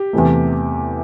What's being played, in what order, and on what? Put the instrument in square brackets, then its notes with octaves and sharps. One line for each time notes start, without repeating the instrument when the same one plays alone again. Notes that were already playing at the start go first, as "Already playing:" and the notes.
Already playing: [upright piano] G4
E2 C3 E3 A3